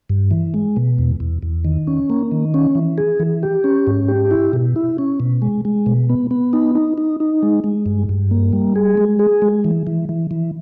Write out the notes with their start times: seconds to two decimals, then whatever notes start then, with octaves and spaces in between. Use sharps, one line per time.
0.09 G2
0.31 E3
0.54 G#3
0.76 B2
0.98 E2
1.20 E2
1.42 E2
1.65 D#3
1.87 C#4
2.10 A#3
2.32 D#3
2.54 C#4
2.75 E3
2.98 G#4
3.20 E3
3.43 G4
3.64 C#4
3.87 G#2
4.08 G4
4.31 E4
4.53 B2
4.76 E4
4.98 C#4
5.20 B2
5.42 G#3
5.65 G#3
5.86 B2
6.09 B3
6.31 B3
6.53 D#4
6.75 D#4
6.98 D#4
7.20 D#4
7.43 G#3
7.64 G#3
7.86 G2
8.09 G2
8.31 A#3
8.53 G3
8.76 G#4
8.97 G#3
9.19 G#4
9.42 G#3
9.64 E3
9.87 E3
10.09 E3
10.31 E3